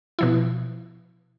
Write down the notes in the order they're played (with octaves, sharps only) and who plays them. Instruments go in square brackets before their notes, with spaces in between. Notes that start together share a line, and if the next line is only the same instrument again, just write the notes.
[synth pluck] B2 F3 E4